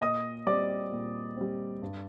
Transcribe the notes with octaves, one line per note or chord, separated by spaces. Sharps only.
A#2 D#5 D#6
G3 C4 D5 D6
A#2
G3 C4
G2